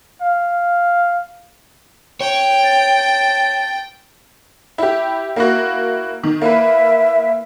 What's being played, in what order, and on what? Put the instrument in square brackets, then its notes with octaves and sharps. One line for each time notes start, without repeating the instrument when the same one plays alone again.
[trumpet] F5
[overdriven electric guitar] C#5 [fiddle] G5
[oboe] A5
[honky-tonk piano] E4 G4
A#3 E4 F#4
D#3
[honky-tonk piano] A#3 E4 B4 [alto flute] E5